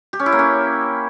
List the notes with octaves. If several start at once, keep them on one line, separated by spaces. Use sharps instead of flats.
G4
C#4
E4
A#3
C#4